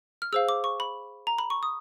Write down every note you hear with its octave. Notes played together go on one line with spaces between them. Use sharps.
F6
G#4 C5 F5 E6
D6
C#6
B5
A#5
B5
C#6
D#6